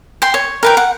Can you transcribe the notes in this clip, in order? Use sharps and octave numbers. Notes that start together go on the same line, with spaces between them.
G5 C6
C#5
A#4 B4 G5
F#5